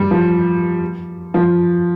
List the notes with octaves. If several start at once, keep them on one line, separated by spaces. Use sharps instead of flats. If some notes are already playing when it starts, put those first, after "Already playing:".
Already playing: G3
F3
F3